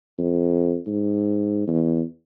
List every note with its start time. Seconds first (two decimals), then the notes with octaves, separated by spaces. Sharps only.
0.19 F2
0.87 G#2
1.68 E2